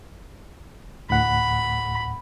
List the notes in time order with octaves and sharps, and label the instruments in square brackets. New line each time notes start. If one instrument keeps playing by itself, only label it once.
[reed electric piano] D2 A2 F#5 [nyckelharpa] B5